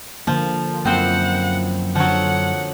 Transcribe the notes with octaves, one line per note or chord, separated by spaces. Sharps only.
D3 F3 A#3
F#2 F3 A#3 C4 E4 F4 C5 F#5
D3 F3 F#3 F#5